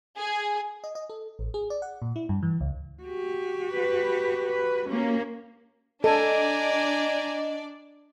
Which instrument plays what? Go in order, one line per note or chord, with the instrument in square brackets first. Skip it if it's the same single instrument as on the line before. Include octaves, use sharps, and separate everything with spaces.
[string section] G#4
[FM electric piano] D#5
D#5
A4
A1
G#4
D5
F#5
A#2
E4
G2
E3
C#2
[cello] F#4 G4
[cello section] B4
B4
A#3 C#4
[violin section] D4 D5 [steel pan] A4 [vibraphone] D#5 [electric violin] G#5 A#5